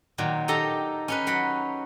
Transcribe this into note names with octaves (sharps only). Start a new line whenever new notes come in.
A#2 D#3 F#3
D#4 G4 A4 A#5
C#4 D#4 B4
F#3 F#5 B5